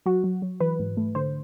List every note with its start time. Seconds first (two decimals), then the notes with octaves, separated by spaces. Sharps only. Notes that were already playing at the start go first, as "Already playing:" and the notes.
0.06 F#3 F#4
0.24 F#3
0.42 F#3
0.60 E3 B4
0.79 G#2
0.97 A3
1.15 D3 C5